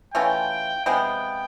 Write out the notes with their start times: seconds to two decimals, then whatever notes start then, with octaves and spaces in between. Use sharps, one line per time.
0.14 E3 A3 C#4 F4 G5
0.86 C3 F3 G#3 B3 G5